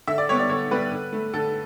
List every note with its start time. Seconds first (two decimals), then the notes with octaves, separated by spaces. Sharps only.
0.07 D3 E5
0.18 D5
0.29 G3 B3 C#5
0.39 D5
0.49 D3 C#5
0.71 G3 B3 B4
0.91 D3
1.13 A3
1.34 D3 A4